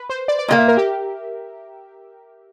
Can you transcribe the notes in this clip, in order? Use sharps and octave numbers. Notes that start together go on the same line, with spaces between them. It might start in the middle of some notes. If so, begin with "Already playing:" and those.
Already playing: B4
C5
D5
D5
A#2 G3 A#3 D#5
E5
A#4
G4